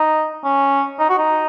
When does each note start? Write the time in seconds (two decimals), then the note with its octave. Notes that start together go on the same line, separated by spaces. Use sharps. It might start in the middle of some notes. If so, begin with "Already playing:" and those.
Already playing: D#4
0.44 C#4
0.99 D#4
1.10 F#4
1.18 D#4